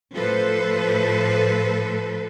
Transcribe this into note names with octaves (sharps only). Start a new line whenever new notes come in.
A2 F3 A4 B4 C5